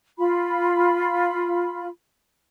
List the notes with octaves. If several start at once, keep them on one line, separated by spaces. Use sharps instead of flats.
F4 B5